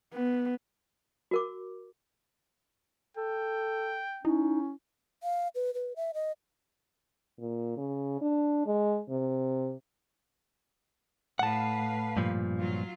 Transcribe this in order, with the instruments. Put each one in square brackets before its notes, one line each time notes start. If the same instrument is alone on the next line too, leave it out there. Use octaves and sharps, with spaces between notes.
[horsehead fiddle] B3
[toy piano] F#4 A#4 D6
[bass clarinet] A4 [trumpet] G5
[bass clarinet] C#4 [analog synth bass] D#4 [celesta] E4
[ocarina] F5
B4
B4
E5
D#5
[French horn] A#2
C#3
D4
G#3
C3
[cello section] A2 B4 F5 [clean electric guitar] F#5 A5
[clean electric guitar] G2 A#2 F3
[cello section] F#3 F4